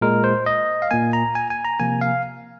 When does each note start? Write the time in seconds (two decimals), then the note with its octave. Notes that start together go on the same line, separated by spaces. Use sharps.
0.01 A#2 G#3 A#4
0.24 C5
0.46 D#5
0.82 F5
0.91 A#2 A#3 G#5
1.13 A#5
1.35 G#5
1.50 G#5
1.65 A#5
1.80 C3 F3 A#3 G#5
2.01 F5